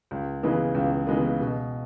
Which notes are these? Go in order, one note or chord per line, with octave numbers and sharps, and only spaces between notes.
C#2
C#3 E3 G#3 B3
C#2
C#3 E3 G#3 B3
B2